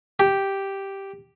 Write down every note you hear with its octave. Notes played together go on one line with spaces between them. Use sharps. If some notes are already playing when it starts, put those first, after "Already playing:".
G4